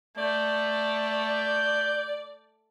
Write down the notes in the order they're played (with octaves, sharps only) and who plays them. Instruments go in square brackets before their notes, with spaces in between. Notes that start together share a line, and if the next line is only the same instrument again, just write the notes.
[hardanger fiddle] A3 [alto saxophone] D5 [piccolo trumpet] G6